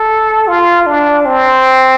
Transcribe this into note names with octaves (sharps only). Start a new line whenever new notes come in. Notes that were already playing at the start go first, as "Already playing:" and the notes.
Already playing: A4
F4
D4
C4